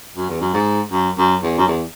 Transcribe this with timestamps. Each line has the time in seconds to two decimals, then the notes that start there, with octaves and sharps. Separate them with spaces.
0.16 F#2
0.29 E2
0.40 F#2
0.54 G#2
0.91 F#2
1.18 F#2
1.43 E2
1.58 F#2
1.68 E2